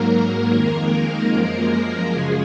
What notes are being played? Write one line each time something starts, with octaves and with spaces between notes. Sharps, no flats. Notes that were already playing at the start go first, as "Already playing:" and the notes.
Already playing: G#2 F#3 A#3 A#4
F2 D#3 G#3
F#2 F3 G#3
F#2 C#3 F3 G#3 G#4